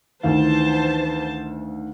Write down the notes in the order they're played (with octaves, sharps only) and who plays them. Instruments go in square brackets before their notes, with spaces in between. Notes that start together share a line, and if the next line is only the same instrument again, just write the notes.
[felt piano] D2 D#3 F5 [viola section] E3 C5 A5